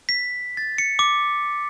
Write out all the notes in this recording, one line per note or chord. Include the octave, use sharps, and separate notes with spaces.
B6
A6
C#7
D6